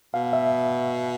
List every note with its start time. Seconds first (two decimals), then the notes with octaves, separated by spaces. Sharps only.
0.14 B2 F5
0.33 E5